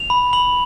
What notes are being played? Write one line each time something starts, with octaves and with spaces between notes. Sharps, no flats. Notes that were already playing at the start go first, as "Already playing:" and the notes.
Already playing: F7
B5
B5 F#7